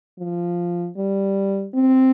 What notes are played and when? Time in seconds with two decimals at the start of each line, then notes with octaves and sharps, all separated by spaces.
0.19 F3
0.97 G3
1.75 C4